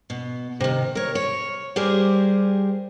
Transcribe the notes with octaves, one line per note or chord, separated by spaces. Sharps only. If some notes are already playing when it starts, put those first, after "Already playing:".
B2
C3 D#3
A#4 C#5
C#5
G3 G4 G#4 A#4 C5